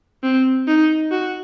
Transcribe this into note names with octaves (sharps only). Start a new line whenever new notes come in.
C4
D#4
F#4